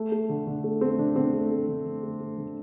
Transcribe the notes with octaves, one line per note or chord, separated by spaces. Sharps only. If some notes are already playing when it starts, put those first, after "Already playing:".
Already playing: A3
A3
D3
D3
A3
A3 C4
D3 D4
D3 C4
A3
A3
D3
D3
A3
A3
D3